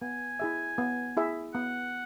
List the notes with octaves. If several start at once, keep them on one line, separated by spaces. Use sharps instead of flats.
B3 G#5
E4 G#4 E5
B3
E4 G#4 E5
B3 F#5